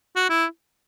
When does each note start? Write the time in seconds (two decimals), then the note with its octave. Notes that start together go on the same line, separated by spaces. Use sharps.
0.16 F#4
0.29 E4